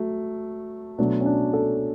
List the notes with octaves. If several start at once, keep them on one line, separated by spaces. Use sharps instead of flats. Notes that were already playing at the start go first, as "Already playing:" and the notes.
Already playing: F#3 A3
B2 F#3 A3 D4
C#4
D4
A4